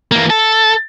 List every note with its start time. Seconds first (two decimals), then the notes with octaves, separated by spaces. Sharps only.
0.12 E3 A#3
0.30 A4